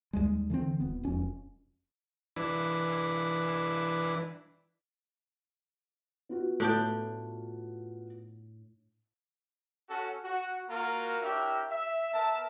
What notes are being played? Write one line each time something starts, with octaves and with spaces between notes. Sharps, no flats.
D#2 G3 G#3
D3 E3 G#3 C4
D#1 B3
E1 F2 C#4
E3 D4 B4
B3 F4 F#4
A2 D4 G5
C#4 F#4 A4
F#4
A#3 F4 F#4 A#4
D4 E4 G4 A#4 C#5 E5
E5
B3 A#4 E5 A5